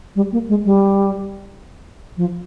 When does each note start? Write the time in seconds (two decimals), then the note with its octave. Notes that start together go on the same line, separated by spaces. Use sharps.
0.16 G3
0.32 A#3
0.49 G#3
0.65 G3
2.17 F3